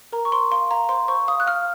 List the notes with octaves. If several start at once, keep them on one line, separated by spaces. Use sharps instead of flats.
A#4 A#5
C#6
C5 C6
F5 C6
F5 A#5
C5 C6
C5 C#6
F5 D#6
F#6
F5 F6